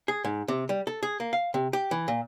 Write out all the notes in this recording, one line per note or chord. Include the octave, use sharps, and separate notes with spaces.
G#4
G#2
C3
G3
A4
G#4
A#3
F5
C3
G4
E3
A#2